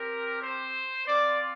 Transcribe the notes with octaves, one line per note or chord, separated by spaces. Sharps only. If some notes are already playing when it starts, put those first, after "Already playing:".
Already playing: C4 G4 A#4
C5
C4 F4 D5